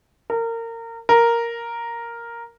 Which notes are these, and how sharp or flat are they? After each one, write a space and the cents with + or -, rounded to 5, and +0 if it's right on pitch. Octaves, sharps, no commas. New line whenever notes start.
A#4 -25
A#4 +0